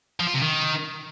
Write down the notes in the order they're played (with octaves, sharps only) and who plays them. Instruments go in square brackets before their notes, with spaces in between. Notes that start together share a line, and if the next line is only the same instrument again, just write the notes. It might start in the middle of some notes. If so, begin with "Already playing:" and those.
[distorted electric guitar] F3
F4
C3
D#3